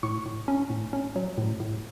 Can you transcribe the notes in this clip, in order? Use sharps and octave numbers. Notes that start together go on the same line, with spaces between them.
A2 C#6
A2
C#4
A2
C#4
F#3
A2
A2